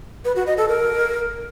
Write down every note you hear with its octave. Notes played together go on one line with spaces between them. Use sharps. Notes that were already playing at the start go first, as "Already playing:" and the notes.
B4
F#4
D#5
A4
A#4